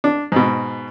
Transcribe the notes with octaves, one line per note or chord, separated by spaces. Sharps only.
D4
G#2 B2